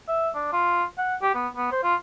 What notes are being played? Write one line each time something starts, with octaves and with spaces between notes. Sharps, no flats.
E5
D4
F4
F#5
G4
B3
B3
C5
F4